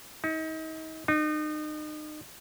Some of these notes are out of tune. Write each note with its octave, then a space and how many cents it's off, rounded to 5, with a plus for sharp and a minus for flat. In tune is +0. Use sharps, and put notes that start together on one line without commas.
D#4 +35
D#4 -35